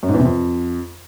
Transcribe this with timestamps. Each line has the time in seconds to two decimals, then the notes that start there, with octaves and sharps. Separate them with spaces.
0.03 F#2
0.08 G#2
0.14 E2
0.20 C3
0.25 F2